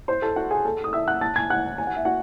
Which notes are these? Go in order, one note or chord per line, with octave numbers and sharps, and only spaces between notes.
C5 C6
A4 A5
F#4 F#5
G#4 G#5
A4 A5
D#6
E5 E6
F#5 F#6
A5 A6
G#5 G#6
F#5 F#6
G#5
F#5
E5
F#4 F#5